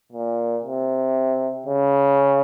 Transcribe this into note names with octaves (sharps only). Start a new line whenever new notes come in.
A#2
C3
C#3